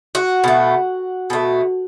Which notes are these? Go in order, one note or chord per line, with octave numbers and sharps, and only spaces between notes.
F#4
B2 A3
B2 A3